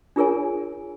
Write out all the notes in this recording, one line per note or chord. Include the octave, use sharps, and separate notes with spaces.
D4 F4 G#4 A#4 C#5 G#5